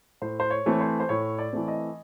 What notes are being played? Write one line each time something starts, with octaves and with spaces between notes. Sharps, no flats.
A2 C5
C5
C#5
E3 A3 C4
C5
C5
A2 C#5
D5
E3 A3 C4
D#5